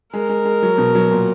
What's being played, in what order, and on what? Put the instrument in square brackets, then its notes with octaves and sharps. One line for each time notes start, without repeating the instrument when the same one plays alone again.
[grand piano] G#3 [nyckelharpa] A#4
[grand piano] G#3
G#3
F#3
B2
F#3
A#2